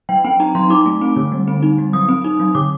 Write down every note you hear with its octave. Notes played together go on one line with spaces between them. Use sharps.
F#3 G5
C4 G5
D#4 A#5
F#3 C6
D#4 D6
A3
C4
D3
G3
C4
D#4
G3
F#3 D#6
C4
D#4
F#3
D3 D6